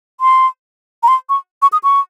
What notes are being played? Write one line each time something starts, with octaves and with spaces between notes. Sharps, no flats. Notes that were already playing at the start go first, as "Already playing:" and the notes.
C6
A#5
C6
C#6
C#6
D#6
C#6